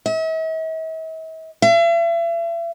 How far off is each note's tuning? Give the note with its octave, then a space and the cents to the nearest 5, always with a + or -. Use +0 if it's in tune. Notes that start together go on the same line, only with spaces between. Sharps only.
E5 -45
E5 +40